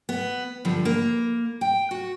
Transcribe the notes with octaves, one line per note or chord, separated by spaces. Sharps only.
B3
G2 D3 F3
A#3
G5
F#4